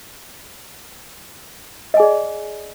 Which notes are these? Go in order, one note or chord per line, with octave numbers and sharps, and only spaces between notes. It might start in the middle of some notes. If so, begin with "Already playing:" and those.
G#4 D5 D#5 G#5